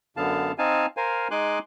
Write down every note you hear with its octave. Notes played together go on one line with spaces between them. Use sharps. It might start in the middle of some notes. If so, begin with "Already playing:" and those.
F#2 D3 B3 F5 A5
C4 D#4 F5 G#5 A5
A#4 C5 F5 G#5
G#3 D#4 G#5 C6 D6 F#6